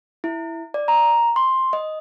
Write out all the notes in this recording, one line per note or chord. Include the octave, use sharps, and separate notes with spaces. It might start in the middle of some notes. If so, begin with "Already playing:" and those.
E4
D5
A#5
C6
D#5